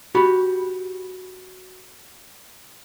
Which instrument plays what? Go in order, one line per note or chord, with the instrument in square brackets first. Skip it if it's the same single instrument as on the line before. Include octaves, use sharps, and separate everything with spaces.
[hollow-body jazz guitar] F#4 G4 B5